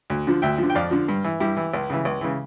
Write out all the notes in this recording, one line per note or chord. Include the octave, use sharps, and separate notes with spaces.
D2
D3 F3
D2 E5 G5
D3 F3
G5
F2 D5 F5
D3 F3
G2
E3
G2 E4 G4
E3
C#2
C#3 E3
C#2
C#3 E3